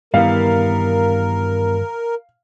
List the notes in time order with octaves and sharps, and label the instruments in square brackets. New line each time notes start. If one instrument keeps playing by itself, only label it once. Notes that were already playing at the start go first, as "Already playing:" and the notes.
[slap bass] G2 D#3 E3 [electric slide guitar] G3 B3 E4 [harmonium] A#4 [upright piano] F5